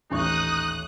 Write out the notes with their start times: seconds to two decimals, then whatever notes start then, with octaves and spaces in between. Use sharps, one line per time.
0.10 D#1 A1 D#4 C#6 D#6 F#6